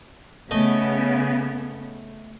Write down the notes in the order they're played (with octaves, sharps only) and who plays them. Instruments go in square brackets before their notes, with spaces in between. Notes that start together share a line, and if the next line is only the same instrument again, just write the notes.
[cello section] C#3 B3 [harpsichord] A3 D#5